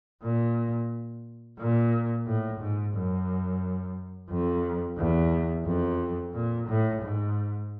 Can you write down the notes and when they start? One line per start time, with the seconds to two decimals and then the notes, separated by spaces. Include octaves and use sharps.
0.23 A#2
1.59 A#2
2.26 A2
2.60 G#2
2.94 F#2
4.30 F2
4.98 E2
5.65 F2
6.34 A#2
6.68 A2
7.01 G#2